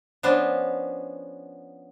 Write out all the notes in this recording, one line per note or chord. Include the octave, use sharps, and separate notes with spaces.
F3 B3 C#4 D4